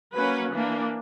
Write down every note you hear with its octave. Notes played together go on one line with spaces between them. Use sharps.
F#3 A#3 C#4 B4
E3 A#3 D4